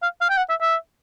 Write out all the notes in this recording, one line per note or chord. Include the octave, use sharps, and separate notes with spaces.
F5
F5
G5
F#5
E5
E5